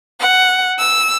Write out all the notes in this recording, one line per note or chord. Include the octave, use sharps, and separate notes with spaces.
F#5
E6